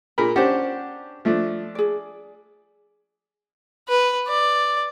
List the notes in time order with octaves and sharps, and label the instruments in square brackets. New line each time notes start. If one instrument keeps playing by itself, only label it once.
[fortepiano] A#2 A#4 B5 [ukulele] G#4
[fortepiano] C#4 D4 G4 [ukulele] C5 F#5
[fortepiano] F3 A3 D4
[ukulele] G#4 D5
[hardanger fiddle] B4
D5